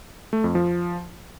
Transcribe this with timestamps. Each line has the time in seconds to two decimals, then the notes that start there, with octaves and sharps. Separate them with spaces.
0.33 A3
0.44 F2
0.55 F3